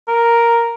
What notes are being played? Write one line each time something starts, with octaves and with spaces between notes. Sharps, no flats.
A#4